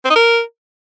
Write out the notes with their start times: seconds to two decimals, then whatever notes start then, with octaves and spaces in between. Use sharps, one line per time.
0.05 C4
0.10 D#4
0.16 A#4